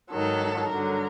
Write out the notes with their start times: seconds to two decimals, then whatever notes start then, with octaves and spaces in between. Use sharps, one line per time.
0.11 G#2 D#3 F#3 A4
0.68 G2 D3 F#3 A#4